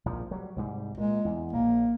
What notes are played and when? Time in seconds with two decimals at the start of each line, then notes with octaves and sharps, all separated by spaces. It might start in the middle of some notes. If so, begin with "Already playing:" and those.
0.06 A#1 G#2 F3
0.31 F#3 G3
0.56 C2 G#2 G3
0.97 A#2 G#3
1.25 E2
1.53 A#1 A#3